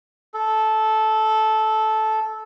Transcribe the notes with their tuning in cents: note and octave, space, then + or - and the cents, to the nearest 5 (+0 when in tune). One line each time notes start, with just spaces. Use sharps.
A4 -15